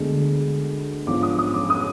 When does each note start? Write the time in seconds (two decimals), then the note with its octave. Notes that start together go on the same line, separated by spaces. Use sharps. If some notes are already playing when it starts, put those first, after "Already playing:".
Already playing: D2 D3 G#3 B3 D4
1.07 G#2 F3 B3 D4 D6
1.23 D#6
1.39 D#6
1.54 D6
1.70 D#6